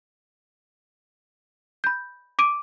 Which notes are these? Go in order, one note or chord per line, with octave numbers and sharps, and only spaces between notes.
B5 G6
D6 D7 D#7